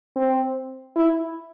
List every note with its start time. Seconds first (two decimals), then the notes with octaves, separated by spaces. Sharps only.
0.16 C4
0.96 E4